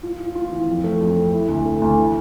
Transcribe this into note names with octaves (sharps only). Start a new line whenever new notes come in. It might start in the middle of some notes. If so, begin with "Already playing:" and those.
F4
F4
F4
E3
F2
A3
F2
A3
E4
D2
A3
D2
E3